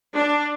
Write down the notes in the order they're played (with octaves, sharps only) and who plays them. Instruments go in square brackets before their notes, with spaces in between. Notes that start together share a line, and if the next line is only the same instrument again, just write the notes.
[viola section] D4